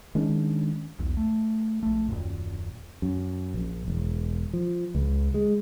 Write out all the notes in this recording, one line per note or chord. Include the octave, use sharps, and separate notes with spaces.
D#3 G#3 C#4 D4
B1 E2
A3
A#1 A3
D#1 F#2 A#2
F#2
A#1
E1
F3
C#2
G#3